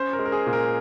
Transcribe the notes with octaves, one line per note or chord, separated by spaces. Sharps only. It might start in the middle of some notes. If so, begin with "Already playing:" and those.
Already playing: C#4 C5
A#4
G#3
A#4
G#4
A#2
A#4